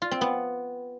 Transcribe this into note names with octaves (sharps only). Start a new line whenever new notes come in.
F4
C4
B3